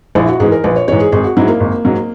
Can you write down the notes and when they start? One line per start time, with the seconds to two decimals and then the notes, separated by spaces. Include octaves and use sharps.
0.15 A#1 E4
0.28 F#4
0.40 G#2 E3 G#4
0.52 A#4
0.64 A#1 B4
0.76 C#5
0.88 G#2 E3 C#5
1.00 G#4
1.12 G#1 G#4
1.24 F#4
1.37 G#2 F#3 E4
1.48 A#3
1.60 G#1
1.85 G#2 F#3